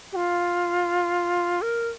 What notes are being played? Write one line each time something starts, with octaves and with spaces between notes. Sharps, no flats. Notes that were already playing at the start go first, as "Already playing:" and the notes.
G4
F4
A#4